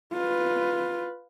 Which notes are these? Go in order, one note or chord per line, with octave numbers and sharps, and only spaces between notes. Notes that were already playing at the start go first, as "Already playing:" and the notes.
F4 B4